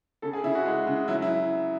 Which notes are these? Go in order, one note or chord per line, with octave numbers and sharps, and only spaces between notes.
C#3 A4
G#4
C#3 E4
F#4
G#3
C#3
F#3 E4
E4